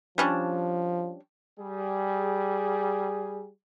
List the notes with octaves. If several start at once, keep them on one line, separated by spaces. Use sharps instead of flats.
F3 G3 C#4 D4
G3 G#4